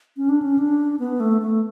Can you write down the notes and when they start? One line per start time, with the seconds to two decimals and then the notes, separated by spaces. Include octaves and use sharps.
0.17 C#4
0.29 D4
0.42 C#4
0.58 D4
0.99 B3
1.20 A3
1.42 A3